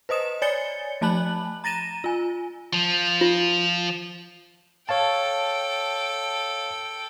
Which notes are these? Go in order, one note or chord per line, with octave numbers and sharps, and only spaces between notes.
B4 C5 D#5 D#6 E7
C#5 D5 G#5 A6 C#7 G7
F3 A3 A5 B5 F#6 F#7
A#5 A6 A#6 D#7 E7
F4 G#5
F3
F4
A4 C#5 F5 G5 A5